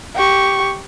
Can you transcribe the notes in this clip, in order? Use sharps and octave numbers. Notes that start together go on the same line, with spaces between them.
G4 C#6